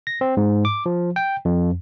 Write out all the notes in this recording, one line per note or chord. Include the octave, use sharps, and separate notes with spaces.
A#6
C4
G#2
D6
F3
G5
F2